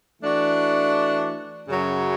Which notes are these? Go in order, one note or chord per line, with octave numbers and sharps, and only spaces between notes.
E3 A3 D4 F#4
F#2 C#3 F#3